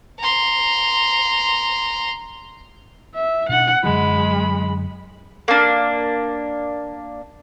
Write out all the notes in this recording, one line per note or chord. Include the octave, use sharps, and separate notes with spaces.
A#5 C6
E5
B2 D4 F#5
F#2 D3 F#3 G#3 B5
A#3 D4